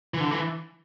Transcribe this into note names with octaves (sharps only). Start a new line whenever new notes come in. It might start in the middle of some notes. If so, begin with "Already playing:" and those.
E3
D3
E3